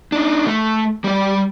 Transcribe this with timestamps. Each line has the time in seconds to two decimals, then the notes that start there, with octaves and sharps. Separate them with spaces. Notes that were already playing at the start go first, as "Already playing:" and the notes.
0.12 D4 D#4
0.47 A3
1.04 G3 D5